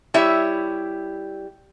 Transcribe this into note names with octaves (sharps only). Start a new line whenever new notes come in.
G3 E4 C#5 E5